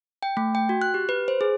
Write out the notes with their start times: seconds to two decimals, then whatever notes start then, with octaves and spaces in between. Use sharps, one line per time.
0.23 G5
0.37 A3
0.55 G5
0.69 F#4
0.82 F#6
0.94 G4
1.09 B4
1.28 C5
1.41 G#4